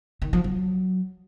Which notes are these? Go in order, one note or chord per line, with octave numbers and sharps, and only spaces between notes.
D#3
F3
F#3